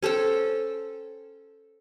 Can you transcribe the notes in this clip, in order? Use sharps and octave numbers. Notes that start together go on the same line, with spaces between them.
C#4 A4 C5 G5